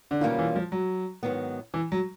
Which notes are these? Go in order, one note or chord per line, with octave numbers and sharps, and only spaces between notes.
D3
B2 D#3 G3 A#3 C#4 F4
E3
F3
F#3
G#2 D#3 F#3 B3
E3
F#3